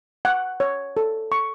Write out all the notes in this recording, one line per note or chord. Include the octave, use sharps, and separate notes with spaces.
F#5
C#5
A4
C#6